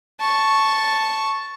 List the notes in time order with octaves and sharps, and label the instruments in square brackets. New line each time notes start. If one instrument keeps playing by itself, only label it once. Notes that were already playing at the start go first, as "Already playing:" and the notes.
[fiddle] A5 C#6